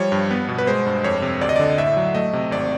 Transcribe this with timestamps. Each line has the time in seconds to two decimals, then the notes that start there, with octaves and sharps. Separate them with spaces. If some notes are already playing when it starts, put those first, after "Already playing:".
Already playing: F3 G3 C#5
0.12 G2
0.31 B3 B4
0.49 B2
0.58 B4
0.67 G#3 C5
0.87 G2
1.04 F2 C#5
1.22 C3
1.41 D2 D5
1.49 D#5
1.56 D3 D5
1.78 A2 E5
1.97 F#3
2.14 A3 D#5
2.33 C3
2.51 G#1 D5